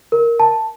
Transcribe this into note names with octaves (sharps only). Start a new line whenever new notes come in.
A#4
A5